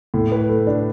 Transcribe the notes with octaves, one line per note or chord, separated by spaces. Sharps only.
A2
B4
A3
D4